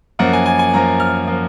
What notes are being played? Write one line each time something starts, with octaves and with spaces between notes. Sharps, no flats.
F#2 F3 A#3 F#5
G#5
G#5
G#5
F#2 F3 A#3 A#5
F6
F3 A#3